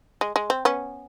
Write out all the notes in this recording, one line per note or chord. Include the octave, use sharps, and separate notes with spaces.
G#3
G#3
C4
B3 C#4